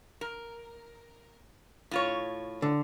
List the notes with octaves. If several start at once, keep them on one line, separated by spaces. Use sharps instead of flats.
A#4
A2 F4 C#5
D3